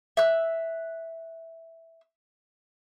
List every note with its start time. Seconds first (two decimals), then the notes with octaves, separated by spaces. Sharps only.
0.17 E5 F#6